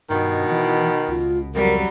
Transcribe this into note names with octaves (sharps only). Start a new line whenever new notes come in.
G2 B2 D#3
E3
C#2 F4
F2 F#3 G3 A#4